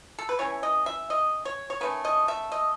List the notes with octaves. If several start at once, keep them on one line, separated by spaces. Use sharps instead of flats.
A4
B4
E3 A3 C#4 C#5
D#5
E5
D#5
C#5
C#5
D#3 A3 C#4 B4
D#5
E5
D#5